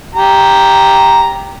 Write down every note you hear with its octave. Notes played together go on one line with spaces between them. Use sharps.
G4 A#5